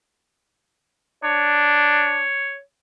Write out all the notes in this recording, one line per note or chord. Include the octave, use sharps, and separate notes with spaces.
D4 C#5